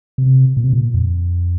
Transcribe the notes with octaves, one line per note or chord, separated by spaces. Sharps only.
C3
A#2
C3
A#2
F2